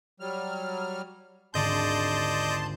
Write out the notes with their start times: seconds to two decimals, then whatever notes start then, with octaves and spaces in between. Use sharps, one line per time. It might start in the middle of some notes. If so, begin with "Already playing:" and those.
0.20 F#3 G3 F6
1.54 D#1 G#1 D3 D5 D#5 A5 C6 G6